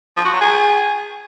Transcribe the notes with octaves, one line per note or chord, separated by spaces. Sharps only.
F3
F#4
F#3
G#4